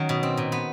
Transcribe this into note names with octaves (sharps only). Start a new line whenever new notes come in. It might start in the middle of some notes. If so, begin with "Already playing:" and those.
Already playing: D#3 F#3 C#4
B2
C4
A#2
B3